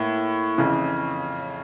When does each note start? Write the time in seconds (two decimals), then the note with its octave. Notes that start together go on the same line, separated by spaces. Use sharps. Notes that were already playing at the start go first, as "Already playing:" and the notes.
Already playing: A2 A#3
0.58 F2 C#3 E3